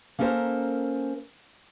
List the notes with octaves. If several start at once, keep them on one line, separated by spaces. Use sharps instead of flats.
A#3 C#4 A4 A#4 C5